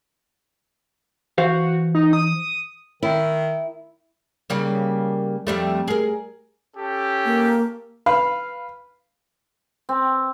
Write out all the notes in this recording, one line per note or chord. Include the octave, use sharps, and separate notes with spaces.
E3 F#4 C5 F5
D#4
D#6
D#3 E4
C#3 G3 A#3
F2 G3 A3
G#4 A#4
C#4 G4 A4
A#3
B4 F5
C4